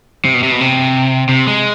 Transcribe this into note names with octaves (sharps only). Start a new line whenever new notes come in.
C3
B2
C3
B2
C3
C3
G#3